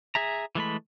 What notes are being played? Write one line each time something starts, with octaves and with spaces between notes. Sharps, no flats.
G#4 E5 A#5
E3 G#3 A3 B5